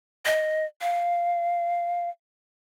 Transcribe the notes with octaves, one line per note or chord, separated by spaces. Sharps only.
D#5
F5